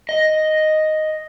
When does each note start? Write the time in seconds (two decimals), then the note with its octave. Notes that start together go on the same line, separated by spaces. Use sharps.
0.09 D#5